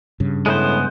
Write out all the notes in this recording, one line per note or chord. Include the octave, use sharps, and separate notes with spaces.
G2 C#3
A2 G#3 B3 C5